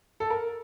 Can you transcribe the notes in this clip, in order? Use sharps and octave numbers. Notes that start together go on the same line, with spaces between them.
A4
A#4